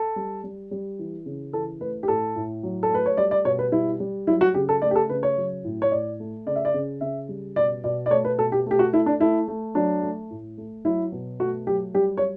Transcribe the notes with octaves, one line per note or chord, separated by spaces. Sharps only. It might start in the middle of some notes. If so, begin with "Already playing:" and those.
Already playing: A4
G3
G3
G3
E3
C#3
E3 A4
A3 B4
G4
A2 A4
A2
F#3
A4
A3 B4
C#5
G3 D5
D5
B2 C#5
B4
G3 E4
G3
F#3 E4
F#4
C#3 G4
A4
A3 D5
G4
A4
C#3 B4
C#5
F#3
A2
C#5
A2 D5
A3
C#3 D5
E5
D5
C#3
C#3 E5
G3
B2 D5
B2 D5
D5
A3 C#5
B4
B2 A4
G4
A3 G4
F#4
A3 E4
D4
A3 E4
A3
F#3 D4
A3
A2
A3
F#3 E4
B2
A3 F#4
F#3 G4
G3 G4
C#5
G3